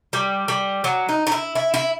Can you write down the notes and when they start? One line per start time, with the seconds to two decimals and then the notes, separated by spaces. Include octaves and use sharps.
0.13 G3
0.48 G3
0.84 F#3
1.09 D#4
1.27 D#4
1.32 E4
1.55 E4
1.74 E4